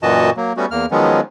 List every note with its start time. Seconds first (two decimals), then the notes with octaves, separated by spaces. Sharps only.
0.03 F#2 A#2 E3 F#4 D#5 A5
0.37 F#3 A#3
0.57 G3 A3 B3 C#4 F#4
0.71 E2 A#3 F6
0.91 D#3 F3 F#3 G#3 B3 C#4